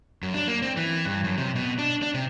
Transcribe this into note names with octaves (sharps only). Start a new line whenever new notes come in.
F#2
D4
A#3
C4
E3
G2
F#2
C3
B2
D4
D4
C3